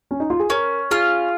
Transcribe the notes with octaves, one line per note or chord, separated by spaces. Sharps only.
C#4
D#4
F4
G#4
C#4 A#4
F4 G#4